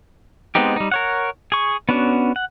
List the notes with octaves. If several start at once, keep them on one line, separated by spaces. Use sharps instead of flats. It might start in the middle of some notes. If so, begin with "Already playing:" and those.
G#3 B3 C4 D#4 G4
G3 D#4
A#4 C#5 F#5
G#4 C#6
B3 C#4 D4 F#4
F#5